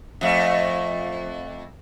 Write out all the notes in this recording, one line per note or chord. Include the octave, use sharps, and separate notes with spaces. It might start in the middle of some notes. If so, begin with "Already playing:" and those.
F2 A3